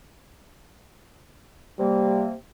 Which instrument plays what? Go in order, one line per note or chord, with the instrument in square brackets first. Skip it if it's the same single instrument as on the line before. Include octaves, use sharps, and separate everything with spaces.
[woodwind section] C3 A#3 [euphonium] G3